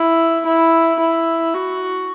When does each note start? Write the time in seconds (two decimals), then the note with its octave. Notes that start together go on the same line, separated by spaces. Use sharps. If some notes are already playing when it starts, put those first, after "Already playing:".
Already playing: E4
0.46 E4
1.00 E4
1.54 F#4